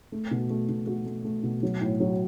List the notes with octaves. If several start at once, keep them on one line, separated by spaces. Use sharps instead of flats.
A3
B2
A3
B2
A3 F#4
A3
A3
B2
F#3
A2
F#3